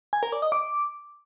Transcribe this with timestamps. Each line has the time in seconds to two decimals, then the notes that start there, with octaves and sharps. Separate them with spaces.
0.13 G#5
0.23 A#4
0.32 D5
0.42 D#5
0.52 D6